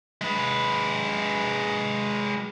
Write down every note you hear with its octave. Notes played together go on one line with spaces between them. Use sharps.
G#3 B4